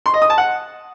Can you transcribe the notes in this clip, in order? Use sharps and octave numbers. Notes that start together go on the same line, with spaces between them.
C6
D#5
D#6
A5
F#5